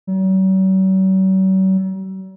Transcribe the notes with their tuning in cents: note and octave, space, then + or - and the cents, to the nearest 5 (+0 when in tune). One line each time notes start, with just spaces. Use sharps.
F#3 +45